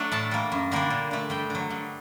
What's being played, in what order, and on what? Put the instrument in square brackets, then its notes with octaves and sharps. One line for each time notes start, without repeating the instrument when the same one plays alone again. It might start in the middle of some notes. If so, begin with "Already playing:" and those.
Already playing: [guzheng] F#3 A3 D4
A2 A5
G3 A#3
F#2
D3 G3 A#3 D4
A#2
A3 D4
G2 G5
D3 F#3
G2